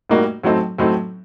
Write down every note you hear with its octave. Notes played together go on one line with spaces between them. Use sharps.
A2 G3 A#3 D#4 F#4
A2 F#3 C4 D#4 A4
A2 F#3 C4 D#4 A4